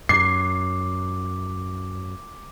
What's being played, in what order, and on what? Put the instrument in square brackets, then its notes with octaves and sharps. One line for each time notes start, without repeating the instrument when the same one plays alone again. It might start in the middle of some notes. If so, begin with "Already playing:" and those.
[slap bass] F#2 [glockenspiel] D6 [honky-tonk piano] C7